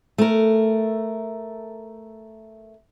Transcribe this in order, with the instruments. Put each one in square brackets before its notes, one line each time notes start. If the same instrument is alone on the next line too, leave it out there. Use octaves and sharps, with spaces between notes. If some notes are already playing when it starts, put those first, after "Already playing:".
[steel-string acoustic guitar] A3 A#4